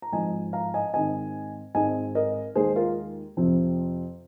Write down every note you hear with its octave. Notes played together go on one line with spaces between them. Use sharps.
A#5
G#1 G#2 F3 D#5 G#5
F5 A#5
D#5 G#5
G#2 D#3 C4 D#5 G#5
G#1 G#2 G#3 C4 D#5 G#5
A#4 D#5
D#2 D#3 G#3 G#4 C5
F4 A#4
F2 C3 F3 C4